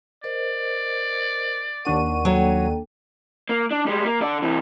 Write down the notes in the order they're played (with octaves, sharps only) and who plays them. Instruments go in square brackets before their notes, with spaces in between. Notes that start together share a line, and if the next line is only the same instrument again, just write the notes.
[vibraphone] A#4 C5 D#5 [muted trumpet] D5
[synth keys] D#2 D4 D#7 [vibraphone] A#4 F#5 C#6
[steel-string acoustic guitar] F#3 C#5 [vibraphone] A#3 A4 G5
[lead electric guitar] A#3
D4
G3 G#3
A#3
D3 D5
C3 E3